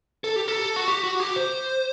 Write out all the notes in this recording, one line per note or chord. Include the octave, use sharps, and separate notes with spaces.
A4
G4
A4
F#4
G4
F#4
G4
C5